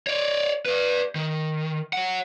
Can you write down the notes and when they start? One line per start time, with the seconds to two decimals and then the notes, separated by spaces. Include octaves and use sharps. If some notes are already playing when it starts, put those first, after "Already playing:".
0.07 C#5 D5
0.66 B4 D5
1.15 D#3
1.93 C#5 F#5